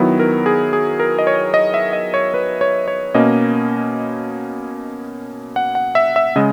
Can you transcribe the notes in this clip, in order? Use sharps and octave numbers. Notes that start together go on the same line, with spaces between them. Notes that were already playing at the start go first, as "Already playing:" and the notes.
Already playing: D#3 F#3 B3 E4
A#4
G#4
G#4
A#4
D#5
C#5
D#5
E5
D#5
C#5
B4
C#5
C#5
B2 A#3 C#4 D#5
F#5
F#5
E5
E5
C#3 G#3 D#5